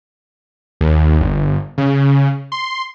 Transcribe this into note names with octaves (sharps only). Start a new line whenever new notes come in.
D#2
G1
C#3
C6